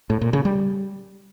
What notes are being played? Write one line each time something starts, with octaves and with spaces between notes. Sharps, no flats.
A2
A#2
C#3
G3